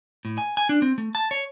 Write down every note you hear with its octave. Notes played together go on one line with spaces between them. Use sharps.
A2
G#5
G#5
D4
C4
A3
A5
C#5